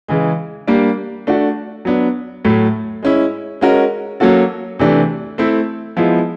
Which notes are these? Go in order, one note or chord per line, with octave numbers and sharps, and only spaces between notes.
C#3 E3 G#3
G3 A#3 D4
A3 D4 F#4
F#3 B3 D4
A2 F#3 A3
G#3 C#4 E4
G#3 C#4 F#4 A#4
F#3 A#3 C#4 F#4 A4
C3 E3 A3 D4
A3 C4 E4
F3 G#3 B3 E4